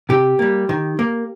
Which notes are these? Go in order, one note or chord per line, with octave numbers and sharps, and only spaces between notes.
C3 G4
G3 A#3
D#3
A#3